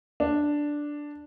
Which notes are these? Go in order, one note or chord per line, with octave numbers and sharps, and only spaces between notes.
D4